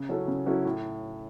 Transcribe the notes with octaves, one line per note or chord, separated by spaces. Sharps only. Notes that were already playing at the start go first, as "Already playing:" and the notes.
Already playing: C#3
F#3 C#4 E4 A4
C#3
F#3 C#4 E4 A4
A2